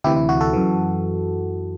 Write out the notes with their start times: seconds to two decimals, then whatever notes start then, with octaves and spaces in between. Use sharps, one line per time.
0.04 D2 C3 E3 E4 G4
0.16 E4
0.29 F#4
0.41 F#4 A4
0.53 F#2 E3